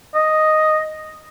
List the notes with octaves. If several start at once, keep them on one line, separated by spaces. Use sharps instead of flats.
D#5